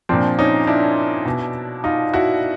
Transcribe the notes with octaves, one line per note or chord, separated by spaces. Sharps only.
A#2 F3 C4 D4
C#4 D#4
D4 E4
B2
D#4 F4
E4 F#4